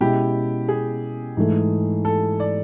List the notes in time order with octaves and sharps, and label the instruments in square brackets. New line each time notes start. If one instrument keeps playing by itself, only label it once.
[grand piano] B2 G#3 C#4 E4 [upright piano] G4
[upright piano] G#4
[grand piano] G#2 E3 A3
[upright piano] A4
D5